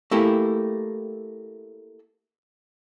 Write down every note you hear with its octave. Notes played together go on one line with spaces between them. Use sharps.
A3 A#3 E4 G4